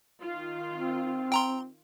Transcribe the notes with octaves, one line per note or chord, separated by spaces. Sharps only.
D#3 F4
C4
G5 A#5 C6